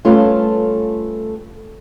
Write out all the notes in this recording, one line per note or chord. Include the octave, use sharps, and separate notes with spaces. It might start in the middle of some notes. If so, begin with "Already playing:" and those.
G3 A3 C#4 F4 A4 B4